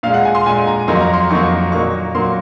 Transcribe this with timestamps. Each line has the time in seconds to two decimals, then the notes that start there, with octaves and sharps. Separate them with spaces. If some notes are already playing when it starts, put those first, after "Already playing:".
0.03 A#2 G#3 F5
0.14 F#5
0.25 G#5
0.35 C6
0.46 A#2 G#3 G#5
0.67 A#5
0.88 F2 D#3 F#3 A#3 C6
1.01 A#5
1.13 C6
1.30 F2 D#3 F#3 A#3 C#6
1.72 A#2 F#3 A#3 C#6
2.14 A#2 F#3 A#3 C6